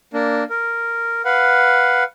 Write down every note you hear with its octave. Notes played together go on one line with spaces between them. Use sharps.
A#3 D4
A#4
B4 F5 F#5